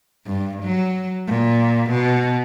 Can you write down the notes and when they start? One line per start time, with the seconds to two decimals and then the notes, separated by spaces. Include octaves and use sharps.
0.27 G2
0.63 F#3
1.28 A#2
1.90 B2